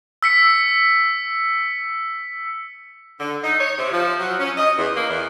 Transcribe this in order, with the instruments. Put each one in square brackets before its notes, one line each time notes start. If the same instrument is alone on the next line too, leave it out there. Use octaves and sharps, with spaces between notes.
[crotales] E6 B6 C#7
[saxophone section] D3
D#4
C#5
C3
F3
F#3
C#4
D#5
E2
A#3
E2